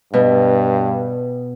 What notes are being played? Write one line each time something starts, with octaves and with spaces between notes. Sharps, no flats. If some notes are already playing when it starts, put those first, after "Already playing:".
G2 B2 B3